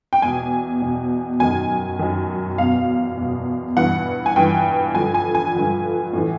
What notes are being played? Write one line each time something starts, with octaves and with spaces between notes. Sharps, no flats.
G5
E2 B2 G#5
E2 B2
F#2 D#3 G#5
F#2 D#3
E2 B2 F5
E2
B2
G2 E3 F#5
G#5
G2 E3 G5
G2 D3 F3 G#5
G#5
G#5
G2 D3 F3
A2 E3